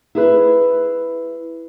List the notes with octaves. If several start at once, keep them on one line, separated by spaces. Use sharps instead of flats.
E4 G#4 B4